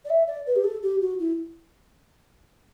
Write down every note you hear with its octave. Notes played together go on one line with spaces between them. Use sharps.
D5
E5
D5
B4
G4
A4
G4
F#4
E4